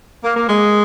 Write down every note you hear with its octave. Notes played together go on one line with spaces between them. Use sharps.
A#3
A#3
G#3